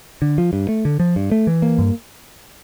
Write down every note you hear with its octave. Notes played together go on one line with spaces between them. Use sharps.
D3
F3
G2
A3
D3
F3
G2
A3
E3
A#3
G2